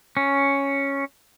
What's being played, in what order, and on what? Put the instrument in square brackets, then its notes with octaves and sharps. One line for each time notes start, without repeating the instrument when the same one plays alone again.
[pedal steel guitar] C#4